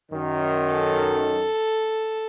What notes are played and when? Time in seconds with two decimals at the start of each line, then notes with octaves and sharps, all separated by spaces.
0.11 F#2 D#3
0.73 A4